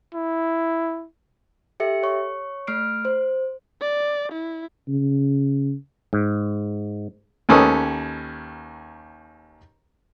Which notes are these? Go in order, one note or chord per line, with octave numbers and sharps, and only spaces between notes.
E4
G4 A4 E5 C#7
C#5 C#6
A3 F6 C7 D7
C5
D5
E4
C#3
G#2
D#2 D#3 C#4 A4 B4 D#6